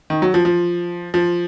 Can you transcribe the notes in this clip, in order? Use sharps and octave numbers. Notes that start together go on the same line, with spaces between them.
D#3
F#3
F3
F3
F3